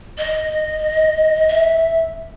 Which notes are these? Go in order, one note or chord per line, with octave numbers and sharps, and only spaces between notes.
D#5
E5